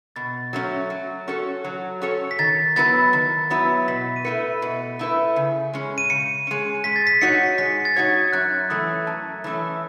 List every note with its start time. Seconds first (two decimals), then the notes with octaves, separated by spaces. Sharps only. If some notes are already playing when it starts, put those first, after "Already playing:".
0.16 B2 A6
0.53 F#3 A3 C#4
0.90 F#3
1.28 C#4 F#4 A4 C#5
1.64 F#3
2.02 C#4 F#4 A4 C#5
2.31 B6
2.39 D#3 A6
2.76 F#3 B3 E4 B4 A6
3.13 D#3
3.50 F#3 B3 E4 B4
3.88 B2 B6
4.16 D#7
4.25 A3 E4 B4 C#7
4.62 B2
4.99 A3 E4 B4
5.36 C#3
5.74 G#3 C#4
5.98 D#7
6.10 C#3 C#7
6.47 G#3 C#4
6.84 G#3 B6
6.96 A6
7.07 B6
7.21 D#4 F#4 C#5 C#7
7.58 G#3 B6
7.85 A6
7.96 D#4 F#4 C#5 G#6
8.33 F#2 F#6
8.70 E3 A3 C#4 D#6
9.07 F#2 A5
9.44 E3 A3 C#4